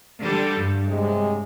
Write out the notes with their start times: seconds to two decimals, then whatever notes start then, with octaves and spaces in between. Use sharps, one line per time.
0.22 D3 G3 A4
0.57 G2
0.87 A2 C3 G#3